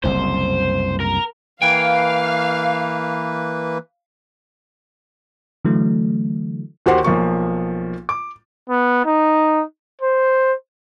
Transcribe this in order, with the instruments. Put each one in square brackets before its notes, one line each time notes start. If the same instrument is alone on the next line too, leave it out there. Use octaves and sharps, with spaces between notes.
[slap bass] F#1 C2 F#2 [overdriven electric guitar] C5
[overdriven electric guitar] A#4
[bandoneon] E3 A#3 B4 [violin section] F5 [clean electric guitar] G5 G#5
[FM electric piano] D3 E3 F#3 A3
[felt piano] D#2 F#4 G4 C5 F#5 C6
B1 F3 A#3 C#6
D6
[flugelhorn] B3
D#4
C5